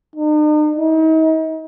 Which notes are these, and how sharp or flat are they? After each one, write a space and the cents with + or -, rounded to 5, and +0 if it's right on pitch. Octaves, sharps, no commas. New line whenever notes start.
D#4 -45
D#4 +40